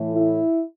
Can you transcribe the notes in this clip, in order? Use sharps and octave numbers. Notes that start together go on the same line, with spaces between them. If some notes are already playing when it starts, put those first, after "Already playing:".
Already playing: A2 E3 A3
E4